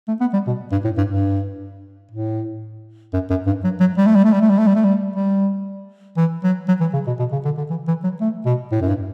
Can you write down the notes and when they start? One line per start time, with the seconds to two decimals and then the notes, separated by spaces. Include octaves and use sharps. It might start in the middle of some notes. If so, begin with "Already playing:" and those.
0.08 A3
0.20 B3
0.33 G3
0.47 B2
0.72 G2
0.84 A2
0.97 G2
1.10 G2
2.11 A2
3.13 F#2
3.30 F#2
3.47 G2
3.64 F#3
3.80 F#3
3.97 G3
4.06 A3
4.15 G3
4.24 A3
4.33 G3
4.41 A3
4.50 G3
4.59 A3
4.67 G3
4.76 A3
4.84 G3
5.16 G3
6.17 E3
6.44 F#3
6.68 F#3
6.81 E3
6.93 C#3
7.07 B2
7.19 B2
7.32 C#3
7.45 D3
7.57 D3
7.70 E3
7.88 E3
8.04 F#3
8.21 A3
8.46 B2
8.72 A2
8.81 F#2
8.88 G2